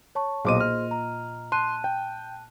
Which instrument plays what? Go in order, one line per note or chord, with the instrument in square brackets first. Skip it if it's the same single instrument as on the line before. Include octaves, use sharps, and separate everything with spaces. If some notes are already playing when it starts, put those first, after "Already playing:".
[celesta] C#5 A5 C#6
[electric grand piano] B1 D6 D#7 [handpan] A#2 D#5 [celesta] G#4 C5 C6
[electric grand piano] F6
[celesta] A#5
[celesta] A5 F#6 D#7 [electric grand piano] C6
[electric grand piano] G5